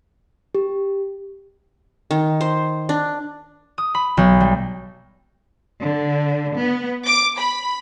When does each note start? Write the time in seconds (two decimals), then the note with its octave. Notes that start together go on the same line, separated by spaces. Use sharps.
0.55 G4
2.11 D#3
2.41 C5
2.89 D4
3.78 D#6
3.94 B5
4.17 B1
4.40 G3
5.81 D3
6.58 B3
7.05 D6
7.36 B5